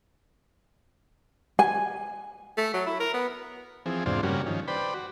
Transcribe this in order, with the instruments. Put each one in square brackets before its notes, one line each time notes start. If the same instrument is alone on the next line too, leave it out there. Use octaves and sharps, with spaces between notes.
[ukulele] G#5
[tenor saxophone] A3
F#3
E4
A#4
B3
[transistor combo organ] E3 F3 C4 G#4
E2 G#2 C3 D4 F4 C5
G2 C#3 G3 A#3 C#4 F#4
D#3 F3 C#4
B4 C5 D5 G5 B5
F#4